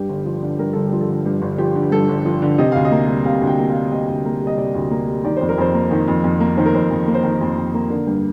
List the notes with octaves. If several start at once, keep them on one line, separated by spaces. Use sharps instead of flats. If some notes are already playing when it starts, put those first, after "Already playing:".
Already playing: G2 G4
G1
F3
D3
G2 A#4
G1 A4
G4
F3
A4
D3
G2 G4
G1
F3 G4
D3
G2 A4
G1
F3
D3
C3 D#5
D2 F5
D#5
A#3
G3
C3 F5
D2
G5
A#3
F5
G3
C3 D#5
D2
A#3
G3
D#5
C3 D5
D2
A#3
G3
D#3 D5
F2 C5
A#4
F2 C5
A#3
D#3
F2
F2
A#3
D#3 C5
A#4
F2 C5
F2
A#3
C5
D#3 A#4
F2
F2
A#3
D3 A#4
G2